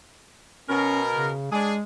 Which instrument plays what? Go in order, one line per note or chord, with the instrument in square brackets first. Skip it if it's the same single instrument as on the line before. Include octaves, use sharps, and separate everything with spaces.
[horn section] B2 A#4 [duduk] C#4
[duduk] C#3
[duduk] G#3 [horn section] D4 G#4